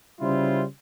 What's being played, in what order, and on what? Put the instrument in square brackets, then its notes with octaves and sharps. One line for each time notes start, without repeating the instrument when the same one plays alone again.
[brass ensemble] C#3 G3 C#4 E4 F4 C5